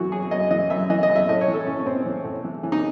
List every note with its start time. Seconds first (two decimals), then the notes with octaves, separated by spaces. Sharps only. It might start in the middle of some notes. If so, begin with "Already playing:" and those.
Already playing: F#2 E3 F#4
0.12 F#2 G#4
0.31 F#2 D#5
0.51 E3 D#5
0.70 F#2 E5
0.90 E3 D#5
1.03 D#5
1.09 F#2
1.16 E5
1.29 A2 D#5
1.41 C#5
1.48 E3
1.54 A4
1.67 A2 C#4
1.79 C#4
1.86 A2 C4
2.06 E3
2.24 A2
2.45 E3
2.63 E3
2.72 D#4